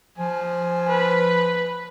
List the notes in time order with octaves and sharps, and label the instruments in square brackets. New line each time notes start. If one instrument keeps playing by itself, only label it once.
[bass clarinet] F3 [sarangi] G#5
[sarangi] B4